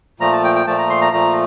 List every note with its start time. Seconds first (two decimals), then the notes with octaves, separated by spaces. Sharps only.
0.20 A#2 F3 A3 A#5
0.32 A5
0.44 G5
0.55 G5
0.66 A#2 F3 A3 A5
0.78 A#5
0.90 C6
1.01 A#5
1.13 A#2 F3 A3 A#5